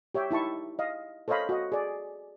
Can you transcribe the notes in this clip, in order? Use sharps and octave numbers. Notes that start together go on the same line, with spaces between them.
G4 C#5 E5 G5
D#4 E4 A5 C#6
D#5 F5
A4 C5 C#5 D#5 F5 B5
F#4 D#5
G#4 D5